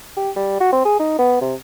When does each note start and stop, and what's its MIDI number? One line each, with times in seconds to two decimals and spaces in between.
0.17 0.30 67
0.36 0.60 55
0.60 0.69 66
0.72 0.82 60
0.85 0.99 68
0.99 1.18 63
1.19 1.39 59
1.41 1.54 48